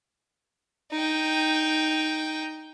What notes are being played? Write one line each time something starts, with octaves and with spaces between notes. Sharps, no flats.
D#4 G5